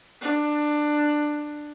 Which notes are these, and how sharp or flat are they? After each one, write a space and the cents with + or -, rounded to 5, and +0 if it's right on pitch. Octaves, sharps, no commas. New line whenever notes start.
D4 +15